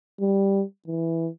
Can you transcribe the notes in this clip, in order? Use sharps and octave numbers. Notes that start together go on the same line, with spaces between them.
G3
E3